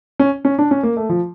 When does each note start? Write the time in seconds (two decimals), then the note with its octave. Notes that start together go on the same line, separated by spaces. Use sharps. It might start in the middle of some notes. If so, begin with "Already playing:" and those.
0.19 C#4
0.45 C#4
0.59 D4
0.71 C#4
0.83 A#3
0.97 A3
1.09 F3